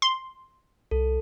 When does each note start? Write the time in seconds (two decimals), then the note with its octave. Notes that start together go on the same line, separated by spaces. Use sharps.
0.02 C6
0.91 C2 A4